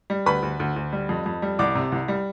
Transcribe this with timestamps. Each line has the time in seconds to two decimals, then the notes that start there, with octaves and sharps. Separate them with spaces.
0.10 G3
0.26 D2 B4 B5
0.43 D2
0.60 D2
0.76 D2
0.93 G3
1.09 F2
1.26 F2
1.42 G3
1.59 C2 D5 D6
1.75 C3
1.92 C2
2.08 G3